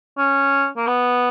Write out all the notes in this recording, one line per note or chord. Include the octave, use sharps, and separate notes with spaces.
C#4
A#3
B3